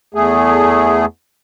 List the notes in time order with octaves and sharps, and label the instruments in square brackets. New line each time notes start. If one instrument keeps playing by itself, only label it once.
[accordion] E2 A3 G#4